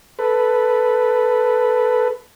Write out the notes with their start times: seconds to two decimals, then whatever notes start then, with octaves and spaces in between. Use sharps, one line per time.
0.19 A4 B4